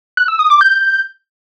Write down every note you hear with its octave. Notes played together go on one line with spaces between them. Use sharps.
F#6
E6
D#6
D6
G6